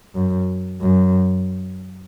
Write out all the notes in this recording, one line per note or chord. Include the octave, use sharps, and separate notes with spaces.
F#2
F#2